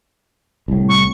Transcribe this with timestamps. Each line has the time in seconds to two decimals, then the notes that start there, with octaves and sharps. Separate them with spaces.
0.68 C2 A2
0.89 C#6